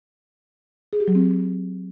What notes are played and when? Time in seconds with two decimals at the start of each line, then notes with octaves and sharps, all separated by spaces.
0.93 G#4
1.00 G4
1.08 F#3
1.15 C4